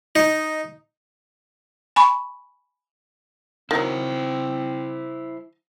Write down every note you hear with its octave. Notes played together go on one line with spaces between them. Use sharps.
D#4
G#5 B5 C#6
D#3 F#3 C4 E4 C5